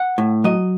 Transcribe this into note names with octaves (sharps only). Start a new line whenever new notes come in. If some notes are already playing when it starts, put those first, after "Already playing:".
Already playing: F#5
A2
F#3 D#5